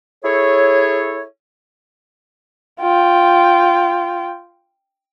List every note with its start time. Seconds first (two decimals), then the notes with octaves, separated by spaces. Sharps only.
0.25 E4 G#4 A4 C#5
2.80 F4 G5